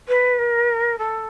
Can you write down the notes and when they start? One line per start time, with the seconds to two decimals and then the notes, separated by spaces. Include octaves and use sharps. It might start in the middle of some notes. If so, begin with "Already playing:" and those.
0.08 B4
0.38 A#4
0.98 A4